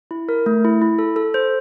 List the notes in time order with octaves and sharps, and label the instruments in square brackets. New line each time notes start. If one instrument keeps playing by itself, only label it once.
[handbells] E4
A#4
A3
E4
E4
A4
A4
C5